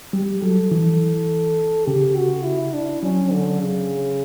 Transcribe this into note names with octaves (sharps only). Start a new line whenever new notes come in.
G3 G4
F#3 A4
E3
C#3 G4
F#4
E4
D4
F#3 C#4
D3
C#3